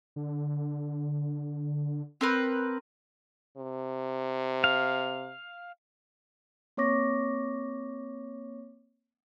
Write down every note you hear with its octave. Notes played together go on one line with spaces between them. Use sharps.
D3
C4 A#4 B4
C3
F5
A#3 C4 C#5 C#6 D6 A#6